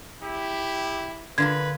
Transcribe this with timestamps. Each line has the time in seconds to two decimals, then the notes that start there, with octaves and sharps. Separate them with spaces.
0.23 E4 G4
1.38 D3 F4 A#4 B4 G#6